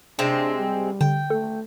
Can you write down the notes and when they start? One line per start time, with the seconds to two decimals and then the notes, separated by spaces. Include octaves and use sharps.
0.19 C3 G#3 C4 D4
0.60 G3
1.01 D3 G5
1.30 A3 A4